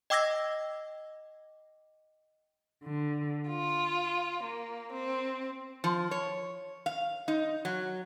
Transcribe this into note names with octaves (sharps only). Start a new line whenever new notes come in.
D#5 G5 D6 E6 G#6 A#6
D3
F4
A#3
C4
F3
C#5
F5
D#4
F#3